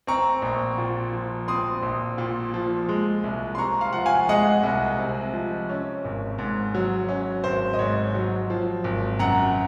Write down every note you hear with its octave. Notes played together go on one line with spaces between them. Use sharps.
C4 A#5 C#6
A#1
A#2
F3
C4 C6 D#6
A#1
A#2
F3
G#3
C2
C6
C3 A#5 C#6
F5
F3 F#5
F5 G#5
G#3 D#5 F#5
C2
C3
F3
C#4
G#1
G#2
F#3
C#4
G#1 C5
D#5
G#2 C#5
F#3
F3
G#1
F#2 F#5 A#5